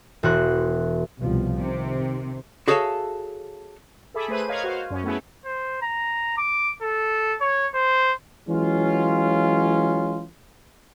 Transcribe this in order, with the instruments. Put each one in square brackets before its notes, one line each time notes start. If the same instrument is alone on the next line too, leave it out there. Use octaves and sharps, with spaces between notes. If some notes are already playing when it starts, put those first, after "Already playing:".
[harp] E1 E3 F#4 C6 F#6
[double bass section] C2 B2 F3
[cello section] C3 [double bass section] D#3 C4
[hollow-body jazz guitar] F#4 G#4 A4 C#5 E5 F5
[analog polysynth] G#4 A4 E5 B5 D6
A3 G#4 B4 C5 D#7
A#4 B4 C#5 D#5 F5 G#6
F#4 C5 F5
F#2 C#4
A3 B3 C#4 E4 G#4
[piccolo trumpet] C5
A#5
D6
A4
C#5
C5
[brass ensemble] E3 F#3 G#3 C#4 F4